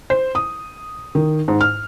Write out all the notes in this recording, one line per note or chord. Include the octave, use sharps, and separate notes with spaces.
C5
D#6
D#3
G#2
F6